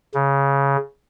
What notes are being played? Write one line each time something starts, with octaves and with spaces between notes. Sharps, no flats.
C#3